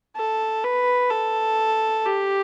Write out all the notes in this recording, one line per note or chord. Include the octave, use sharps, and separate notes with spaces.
A4
B4
A4
G4